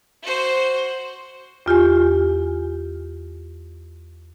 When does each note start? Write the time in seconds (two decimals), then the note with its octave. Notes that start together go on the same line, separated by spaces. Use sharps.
0.23 F#4 C5
1.66 E2 F4 G4 G#5